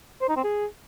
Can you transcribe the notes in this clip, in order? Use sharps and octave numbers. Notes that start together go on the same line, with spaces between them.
C5
D#4
C4
G#4